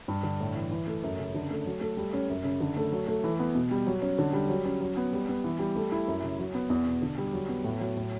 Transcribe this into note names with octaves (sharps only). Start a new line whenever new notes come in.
G2
D3
A2
E3
E3
A3
F#2
C#3
D3
A3
F#3
A3
G3
C#4
F#2
C#3
D3
A3
F#3
A3
E3
B3
B2
G3
F#3
C#4
D3
G3
F#3
C#4
F#3
B3
G3
B3
E3
G3
A3
E4
F#2
C#3
F#3
B3
E2
B2
D3
G3
F#3
B3
A2
F#3
A2